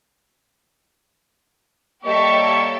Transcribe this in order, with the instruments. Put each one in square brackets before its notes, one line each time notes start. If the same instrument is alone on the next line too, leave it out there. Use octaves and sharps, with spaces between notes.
[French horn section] G3 A#3 C#5 [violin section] G4 A4 E5 [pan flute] D#5 [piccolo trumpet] C#6